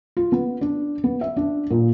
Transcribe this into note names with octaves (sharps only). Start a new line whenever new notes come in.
F4
B3
D4
B3
E5
D4
A#2